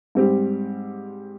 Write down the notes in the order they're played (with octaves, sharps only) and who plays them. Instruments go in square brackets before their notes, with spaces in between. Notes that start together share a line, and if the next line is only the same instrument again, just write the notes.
[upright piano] G#2 G3 C4 G4